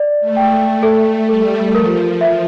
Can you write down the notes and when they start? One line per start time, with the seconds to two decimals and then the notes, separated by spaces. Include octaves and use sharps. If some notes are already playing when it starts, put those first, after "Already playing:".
Already playing: D5
0.20 A3
0.36 G5
0.52 A3
0.83 A3 A4
1.29 G3 A4
1.75 F3 A#4
2.21 E5